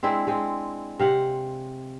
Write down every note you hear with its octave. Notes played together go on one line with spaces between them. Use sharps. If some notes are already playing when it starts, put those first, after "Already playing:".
G#3 C4 D4 E4
G#3 C4
C3 F5 F#5